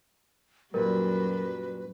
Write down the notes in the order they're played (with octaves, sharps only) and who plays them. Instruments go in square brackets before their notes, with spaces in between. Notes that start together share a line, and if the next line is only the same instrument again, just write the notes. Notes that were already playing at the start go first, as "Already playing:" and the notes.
[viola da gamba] F#2 F#3 [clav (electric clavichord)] A#2 G3 [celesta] A#4 [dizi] B4